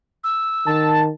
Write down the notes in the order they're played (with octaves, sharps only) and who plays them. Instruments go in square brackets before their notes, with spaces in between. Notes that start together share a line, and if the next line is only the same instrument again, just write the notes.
[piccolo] E6
[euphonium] D#3 [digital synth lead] A5